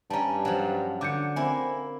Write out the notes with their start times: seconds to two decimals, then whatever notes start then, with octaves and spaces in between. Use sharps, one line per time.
0.10 G2 G3 C#4 A5 A#5
0.45 F3 F#3
1.01 D3 D6 G6 C#7
1.36 A#3 C4 E4 G#5